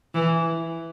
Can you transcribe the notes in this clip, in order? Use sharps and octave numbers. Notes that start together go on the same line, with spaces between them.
E3